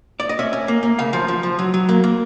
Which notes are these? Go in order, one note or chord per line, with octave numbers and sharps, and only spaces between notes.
D5
D#5
C#4 E5
C#4
A#3
A#3
C#3 F5
F3
F3
F3
F#3
F#3
A#3
A#3